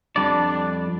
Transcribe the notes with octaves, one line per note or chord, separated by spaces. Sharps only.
F2 G3 D4 D5